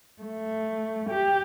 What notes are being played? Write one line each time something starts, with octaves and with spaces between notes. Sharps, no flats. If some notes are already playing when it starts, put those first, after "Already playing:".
A3
G4